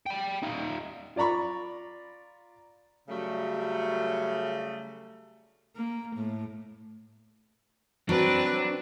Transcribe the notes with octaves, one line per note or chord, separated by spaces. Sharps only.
G5 B5
D#4 F4
F4 D5 A#5 B5 C#6
C#3 F#3 G3 A3
A#3
A2
F#3 C4 D4 B4